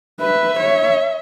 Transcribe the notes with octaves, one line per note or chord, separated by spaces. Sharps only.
B4 E5
C#5